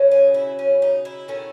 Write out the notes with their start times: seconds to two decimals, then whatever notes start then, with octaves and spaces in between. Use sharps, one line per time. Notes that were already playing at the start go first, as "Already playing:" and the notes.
Already playing: C#3 F#3 C#4
0.11 G#4
0.34 E4
0.59 C#4
0.82 D#4
1.05 E4
1.28 D#3 A3 C#4